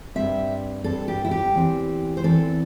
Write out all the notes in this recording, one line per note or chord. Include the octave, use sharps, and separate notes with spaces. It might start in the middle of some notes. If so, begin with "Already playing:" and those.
G2 G3 C4 E5
G2 G3 C4 A4
G4
E4
G4
E2 E3 C4
C5
E2 E3 C4 A4